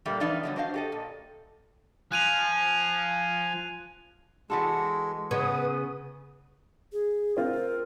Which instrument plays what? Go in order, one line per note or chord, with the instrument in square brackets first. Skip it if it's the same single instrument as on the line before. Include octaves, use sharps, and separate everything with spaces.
[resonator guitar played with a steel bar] A#2 G3 A3 A#3
E3 F3 B3 D#4 F4 D5
D3 F#3 G3
D4 F#4 C5 D#5 F5
G4 A4 D#5
A#2
[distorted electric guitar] F3 [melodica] G#5 [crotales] F#6 D#7 F7
[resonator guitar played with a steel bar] E3 F#4 A4 [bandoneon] G#3
[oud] C#3 [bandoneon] B3 [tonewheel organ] B4 D#6
[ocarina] G#4
[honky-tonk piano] C4 F4 [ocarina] A#4